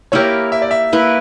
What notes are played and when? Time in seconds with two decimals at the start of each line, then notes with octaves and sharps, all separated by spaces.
0.12 A#3 E4 G4 A#4 C#5
0.52 E5
0.62 D5
0.71 E5
0.93 A#3 E4 B4